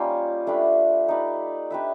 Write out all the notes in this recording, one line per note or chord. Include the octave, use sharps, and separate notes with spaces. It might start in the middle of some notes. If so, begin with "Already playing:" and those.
Already playing: G3 A#3 C#4 D#4 F4
A3 D4 G4 B4
D#4 G4 B4 D5
D4 G4 B4 E5